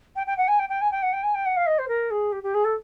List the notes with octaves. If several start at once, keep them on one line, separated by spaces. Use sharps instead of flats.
G5
G5
F#5
G#5
G5
G5
G#5
G5
F#5
G5
G#5
G5
F#5
F5
D#5
C5
A#4
G#4
G4
G4
G#4
A4